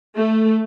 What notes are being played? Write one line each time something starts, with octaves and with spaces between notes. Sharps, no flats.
A3